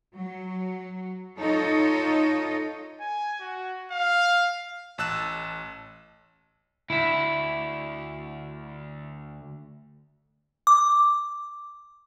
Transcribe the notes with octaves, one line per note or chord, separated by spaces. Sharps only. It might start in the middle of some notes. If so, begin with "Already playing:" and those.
F#3
D#4 F4 A4 C#5 D#5
G#5
F#4
F5
A1 A5 E6 F#6 E7
D2 E4 E5
D6